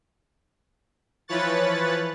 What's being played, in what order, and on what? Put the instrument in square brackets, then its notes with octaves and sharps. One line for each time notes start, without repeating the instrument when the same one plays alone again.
[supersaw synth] E3 F3 B4 C#5 F#6 A6